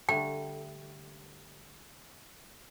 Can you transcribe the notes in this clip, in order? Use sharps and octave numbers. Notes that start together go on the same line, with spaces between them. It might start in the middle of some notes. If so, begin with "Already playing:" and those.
D3 G3 A3 G5